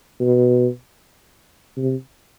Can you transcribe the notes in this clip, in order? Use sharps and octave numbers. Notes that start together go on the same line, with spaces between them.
B2
C3